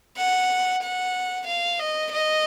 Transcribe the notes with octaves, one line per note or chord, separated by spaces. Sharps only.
F#5
F#5
F5
D#5
D#5